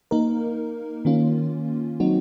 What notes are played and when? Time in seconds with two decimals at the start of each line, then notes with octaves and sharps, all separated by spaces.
0.11 A#3 D#4 A#4
1.05 D#3 A#3 C#4 F4
2.00 F#3 C4 D#4 F#4